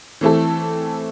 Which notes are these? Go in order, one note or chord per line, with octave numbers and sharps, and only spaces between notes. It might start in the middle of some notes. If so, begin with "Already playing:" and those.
E3 A3 C4 E4 A4